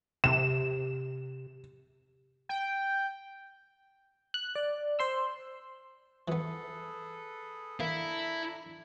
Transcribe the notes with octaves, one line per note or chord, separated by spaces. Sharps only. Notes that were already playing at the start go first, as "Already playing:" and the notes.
C3 E7
G5
F#6
D5
C5 C6 E6
E3 B3 G#4 A4 B4
A#3 D4 E4 A4 A#5